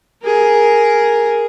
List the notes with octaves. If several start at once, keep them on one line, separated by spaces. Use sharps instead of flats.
G#4 A#4